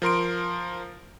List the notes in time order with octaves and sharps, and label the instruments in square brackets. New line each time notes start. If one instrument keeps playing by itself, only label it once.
[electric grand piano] F3 A#4 C6 D7